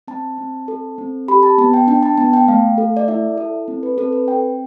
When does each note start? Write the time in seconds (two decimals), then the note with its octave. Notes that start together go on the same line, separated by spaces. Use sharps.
0.08 C4 A5
0.38 C4
0.68 A4
0.98 C4
1.28 G4 B5
1.43 A5
1.58 B3 A5
1.74 G5
1.87 D4 G5
2.03 A5
2.18 B3 A5
2.33 G5
2.48 A3 F5
2.78 A4
2.97 D5
3.08 E4 E5
3.37 A4
3.68 C4
3.83 B4
3.97 C4 A4
4.12 B4
4.28 C4 G5